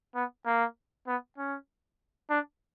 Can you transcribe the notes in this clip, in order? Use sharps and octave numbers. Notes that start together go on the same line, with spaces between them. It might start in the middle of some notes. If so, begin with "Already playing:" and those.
B3
A#3
B3
C#4
D4